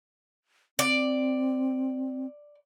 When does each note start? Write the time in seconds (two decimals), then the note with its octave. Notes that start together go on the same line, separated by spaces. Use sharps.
0.79 C4 D5